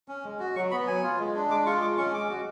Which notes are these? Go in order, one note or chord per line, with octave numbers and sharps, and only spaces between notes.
C#4
G#3
F#4
F#3 C#6
B3 B5
F#3 G#5
F4
G#3
D4
G#3 D6
F4 C#6
G#3 D6
C#4 C#6
G#3 D6
F#4